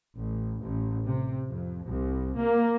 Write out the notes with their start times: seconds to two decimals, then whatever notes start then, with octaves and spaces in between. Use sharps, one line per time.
0.16 A1
0.61 A1
1.06 C3
1.47 F2
1.86 C2
2.37 A#3